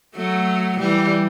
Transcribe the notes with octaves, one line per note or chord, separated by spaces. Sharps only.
F#3 A3
E3 G3